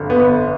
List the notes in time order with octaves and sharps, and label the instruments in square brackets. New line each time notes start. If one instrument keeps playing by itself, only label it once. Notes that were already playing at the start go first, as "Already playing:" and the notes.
Already playing: [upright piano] G1 F2 D3
[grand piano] B3